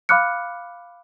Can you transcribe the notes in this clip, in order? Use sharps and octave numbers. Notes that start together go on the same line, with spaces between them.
F5 B5 D6 F6 F#6 C#7